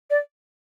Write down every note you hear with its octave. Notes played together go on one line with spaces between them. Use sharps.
D5